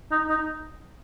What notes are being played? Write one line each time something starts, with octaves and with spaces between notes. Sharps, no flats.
D#4
D#4